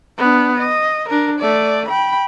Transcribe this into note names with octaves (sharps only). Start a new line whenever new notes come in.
B3 D4
D#5
D4 A#4
A3 D5
G5 B5